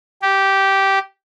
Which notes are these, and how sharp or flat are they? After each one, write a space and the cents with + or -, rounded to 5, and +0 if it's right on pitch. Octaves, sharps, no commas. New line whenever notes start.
G4 -10